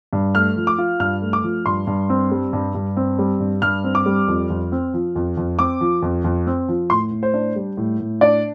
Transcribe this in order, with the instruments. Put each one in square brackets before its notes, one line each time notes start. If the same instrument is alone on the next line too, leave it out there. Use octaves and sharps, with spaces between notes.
[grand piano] G2
A3 F6
F3
D6
F4
G2 F6
A3
D6
F3
G2 C6
G2
C4
G3
G2
G2
C4
G3
G2
G2 F6
C4
D6
G3
F2
F2
C4
F3
F2
F2
C4 D6
F3
F2
F2
C4
F3
A2 C6
A2
C5
D4
G3
A2
A2
D4 D5